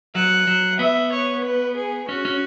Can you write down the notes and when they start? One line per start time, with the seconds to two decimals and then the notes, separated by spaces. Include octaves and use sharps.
0.15 F#3 F#5
0.47 F#3
0.79 B3 E5
1.12 C#5
1.44 B4
1.76 G#4
2.08 C#4 F#4
2.25 C#4